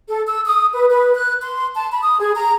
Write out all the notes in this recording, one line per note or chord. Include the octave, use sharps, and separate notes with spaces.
A4
E6
D#6
B4
B4
F#6
C6
A5
B5
D#6
G#4
A#5